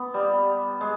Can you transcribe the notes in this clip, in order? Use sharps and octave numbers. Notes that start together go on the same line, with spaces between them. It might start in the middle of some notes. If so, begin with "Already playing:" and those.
Already playing: B3
G3
G#3